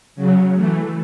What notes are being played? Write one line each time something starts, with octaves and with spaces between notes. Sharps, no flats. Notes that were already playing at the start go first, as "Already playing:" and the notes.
C#3 F#3
E3 A3